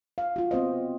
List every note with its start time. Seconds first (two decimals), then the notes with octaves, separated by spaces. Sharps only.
0.18 F5
0.36 F4 F#4
0.51 B3 C4 C5 D#5